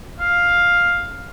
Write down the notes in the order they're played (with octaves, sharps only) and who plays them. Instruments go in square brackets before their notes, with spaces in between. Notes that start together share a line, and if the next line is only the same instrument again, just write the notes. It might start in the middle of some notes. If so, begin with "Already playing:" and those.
[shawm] F5